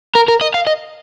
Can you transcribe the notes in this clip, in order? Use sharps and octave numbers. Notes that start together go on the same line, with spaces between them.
A#4
A#4
D#5
F5
D#5